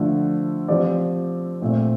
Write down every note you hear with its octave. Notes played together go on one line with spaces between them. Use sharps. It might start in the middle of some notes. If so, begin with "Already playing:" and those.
Already playing: D3 F3 A3
F3 C4 G4 D5
A#2 A3 C4